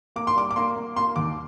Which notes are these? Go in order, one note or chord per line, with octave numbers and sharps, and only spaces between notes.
A#3 D6
C6
G3 D6
D6
A#3 C6
A#3
A#3 C6
D#2 D6